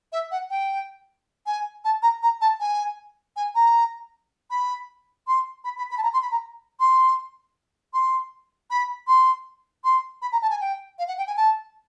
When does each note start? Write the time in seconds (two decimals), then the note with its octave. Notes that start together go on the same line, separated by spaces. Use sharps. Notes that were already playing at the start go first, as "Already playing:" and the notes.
0.12 E5
0.31 F#5
0.50 G5
1.46 G#5
1.84 A5
2.02 A#5
2.23 A#5
2.41 A5
2.60 G#5
3.36 G#5
3.55 A#5
4.50 B5
5.27 C6
5.64 B5
5.78 B5
5.91 B5
5.98 A5
6.03 A#5
6.13 C6
6.22 B5
6.31 A#5
6.80 C6
7.93 C6
8.70 B5
9.07 C6
9.84 C6
10.22 B5
10.32 A#5
10.42 A5
10.50 G#5
10.61 G5
10.99 F5
11.08 F#5
11.18 G5
11.27 G#5
11.37 A5